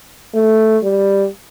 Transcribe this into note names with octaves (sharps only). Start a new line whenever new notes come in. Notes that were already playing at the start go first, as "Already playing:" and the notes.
A3
G3